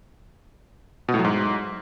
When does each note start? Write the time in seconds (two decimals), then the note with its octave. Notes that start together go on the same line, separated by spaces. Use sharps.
1.08 B2
1.14 A2
1.19 F#3
1.25 G#2